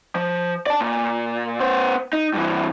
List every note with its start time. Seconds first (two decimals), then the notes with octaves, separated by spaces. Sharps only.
0.15 F3
0.66 D5 A5
0.81 A#2
1.60 B3 C5
2.13 D#4
2.34 G2 E3